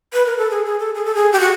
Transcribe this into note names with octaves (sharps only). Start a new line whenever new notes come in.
B4
A#4
A4
G#4
G#4
A4
G#4
A4
G#4
G4
F#4